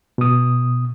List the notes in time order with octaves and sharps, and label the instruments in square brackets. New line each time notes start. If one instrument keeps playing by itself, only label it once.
[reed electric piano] B2 D#6